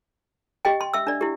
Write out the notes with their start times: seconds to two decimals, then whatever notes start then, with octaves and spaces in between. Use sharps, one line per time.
0.65 G4 D#5 G5
0.81 C6
0.94 E5 E6
1.07 D4 D5
1.21 E4 G4